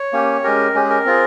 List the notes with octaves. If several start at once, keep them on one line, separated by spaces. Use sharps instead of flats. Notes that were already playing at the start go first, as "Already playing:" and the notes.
Already playing: C#5
A#3 C#4 G4
G#3 C#4 G4 A#4
G#3 C#4 G4
G#4
A#4
C4 F4 G#4